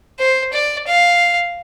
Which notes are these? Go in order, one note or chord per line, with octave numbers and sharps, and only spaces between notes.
C5
D5
F5